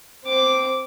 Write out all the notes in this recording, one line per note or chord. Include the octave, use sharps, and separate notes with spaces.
C4 D6